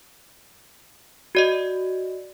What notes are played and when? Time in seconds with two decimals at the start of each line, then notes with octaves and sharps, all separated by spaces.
1.35 F#4 D5 D#5